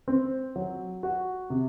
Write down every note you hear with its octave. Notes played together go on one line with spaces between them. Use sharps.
C4
F#3
F#4
C3